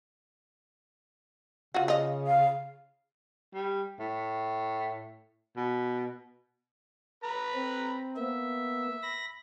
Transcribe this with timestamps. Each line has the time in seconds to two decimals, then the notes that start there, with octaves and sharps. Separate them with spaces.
1.74 C#3 F4 F#4
1.88 F4 D#5
2.27 F5
3.55 G3
3.99 A2
5.56 B2
7.24 B4 A#5 B5
7.54 C4
8.17 A#3 B3 E5
9.02 B5 A#6